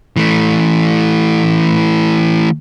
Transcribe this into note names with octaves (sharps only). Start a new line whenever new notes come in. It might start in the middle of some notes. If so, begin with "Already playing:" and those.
E3 A3